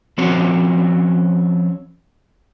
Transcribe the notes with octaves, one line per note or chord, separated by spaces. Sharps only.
F3 C4 C#4 F#4 C#5